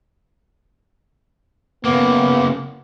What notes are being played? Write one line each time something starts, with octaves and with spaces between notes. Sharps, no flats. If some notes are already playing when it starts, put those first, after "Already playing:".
C#3 A#3 B3